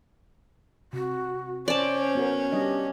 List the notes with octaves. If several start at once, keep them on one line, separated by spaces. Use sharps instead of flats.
C3 F#4
C#4 C5 D5 A5
B3 F#4 A#4
G3 D4 G4 D#5